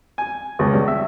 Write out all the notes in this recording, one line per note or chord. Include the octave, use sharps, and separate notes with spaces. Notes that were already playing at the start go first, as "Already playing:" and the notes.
G#5
C#2
G2
E5